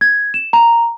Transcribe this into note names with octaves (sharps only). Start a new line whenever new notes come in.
G#6
E7
A#5